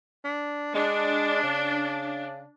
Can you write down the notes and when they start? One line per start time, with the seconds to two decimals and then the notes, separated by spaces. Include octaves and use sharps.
0.25 D4
0.75 G#3 D4
1.43 C#3